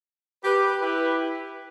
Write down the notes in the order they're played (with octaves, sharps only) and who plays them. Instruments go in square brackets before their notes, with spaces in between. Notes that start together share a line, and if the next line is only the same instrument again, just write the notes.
[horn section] G4 B4
E4 G4 B4